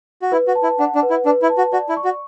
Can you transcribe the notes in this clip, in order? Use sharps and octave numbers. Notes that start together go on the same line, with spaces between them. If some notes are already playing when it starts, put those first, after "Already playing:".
F#4
E4 B4
F#4
A5
E4
D4 F#5
D4
B4
E4
D4 B4
E4
A5
F#4
F#4 D5
E4
C#6
F#4